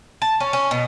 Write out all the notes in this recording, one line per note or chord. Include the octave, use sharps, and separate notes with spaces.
A5
C#4
C#4
B2